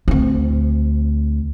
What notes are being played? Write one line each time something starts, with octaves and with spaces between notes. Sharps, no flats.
D2 C4